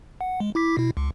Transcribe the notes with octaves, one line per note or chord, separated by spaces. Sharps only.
F#5
G#3
E4 D6 B6
B2 E4
C#2